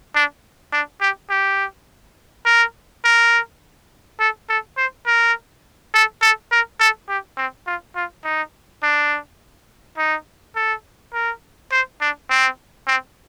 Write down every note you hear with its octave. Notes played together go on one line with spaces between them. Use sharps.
D4
D4
G4
G4
A#4
A#4
A4
A4
C5
A#4
A4
A4
A#4
A4
G4
C4
F4
F4
D#4
D4
D#4
A4
A#4
C5
D4
C4
C4